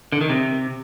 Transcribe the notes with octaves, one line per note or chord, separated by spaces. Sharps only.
D3
D#3
C3